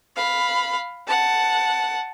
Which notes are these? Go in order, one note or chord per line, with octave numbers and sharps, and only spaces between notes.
F5 B5
F#5 A5